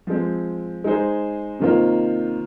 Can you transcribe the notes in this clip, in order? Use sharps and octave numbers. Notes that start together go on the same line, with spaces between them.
F3 G#3 C4
G#3 D#4 G#4 C5
C3 D#3 A#3 F4 C5